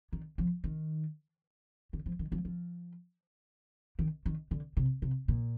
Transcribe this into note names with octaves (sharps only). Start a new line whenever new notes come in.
D#3
F3
D#3
D3
F3
D#3
F3
F3
D#3
D#3
D3
C3
C3
A#2